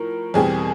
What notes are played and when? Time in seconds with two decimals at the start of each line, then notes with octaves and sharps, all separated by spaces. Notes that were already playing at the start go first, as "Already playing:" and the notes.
Already playing: A2 F3 A#4
0.34 E2 B2 G3 C4 G#4